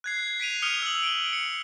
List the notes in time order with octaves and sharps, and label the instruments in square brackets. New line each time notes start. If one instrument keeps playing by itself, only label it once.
[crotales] F#6 G#6 C7
B6 D7 D#7 F7
D#6 F6 C#7 F7 G7
E6 F#7
D7 G7
C#7